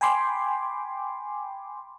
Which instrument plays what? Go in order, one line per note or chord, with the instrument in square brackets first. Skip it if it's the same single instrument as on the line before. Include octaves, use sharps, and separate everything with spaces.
[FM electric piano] G5 G#5 B5 C6 D6